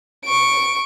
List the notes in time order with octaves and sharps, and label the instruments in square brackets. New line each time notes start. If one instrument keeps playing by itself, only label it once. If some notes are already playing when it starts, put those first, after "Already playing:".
[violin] C#6 D7